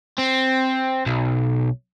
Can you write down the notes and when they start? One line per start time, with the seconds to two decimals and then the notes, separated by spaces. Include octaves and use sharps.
0.18 C4
1.06 B1